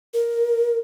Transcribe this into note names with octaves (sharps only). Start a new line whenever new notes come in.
A#4